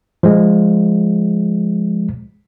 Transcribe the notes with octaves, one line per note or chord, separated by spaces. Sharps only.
F3 G#3